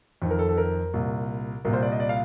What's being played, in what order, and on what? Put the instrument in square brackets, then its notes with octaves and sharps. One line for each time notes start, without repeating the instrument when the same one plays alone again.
[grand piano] F2 D#3
A#4
A4
A4
A#4
C2 A#2
C2 A#2 A#4
C5
D5
D#5
D5
F5